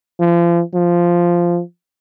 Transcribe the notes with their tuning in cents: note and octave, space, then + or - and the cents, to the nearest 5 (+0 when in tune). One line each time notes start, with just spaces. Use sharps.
F3 -35
F3 -10